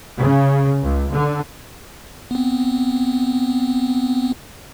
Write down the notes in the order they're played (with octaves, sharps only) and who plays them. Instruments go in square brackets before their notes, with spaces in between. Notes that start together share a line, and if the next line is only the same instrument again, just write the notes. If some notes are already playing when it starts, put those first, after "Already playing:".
[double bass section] C#3
C#2
D3
[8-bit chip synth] B3 C4